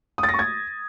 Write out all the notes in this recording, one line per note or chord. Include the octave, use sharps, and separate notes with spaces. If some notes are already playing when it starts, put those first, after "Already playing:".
D#6
A6
A#6
C#6
G#6